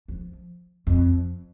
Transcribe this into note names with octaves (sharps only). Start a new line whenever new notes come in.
F3
F2